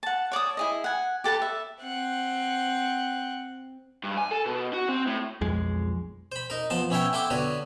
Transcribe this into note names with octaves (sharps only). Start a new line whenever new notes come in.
F#5 A5
C#5 D5 A5 D#6
E4 G#4 D#5
F#5 G#5
G4 A4 B4 A5
E5
C4 F#5
G2
G#5
A4
B2
F#4
C4
A2
B1 F2 G#3
C5 B5
D#4 A#4
F3 B3 A5 C6
B3 C#4 E4 C#5 E5 G5
E4 A4 F#5 G5 C6 D6
D3 B3 F#4 B4 C#5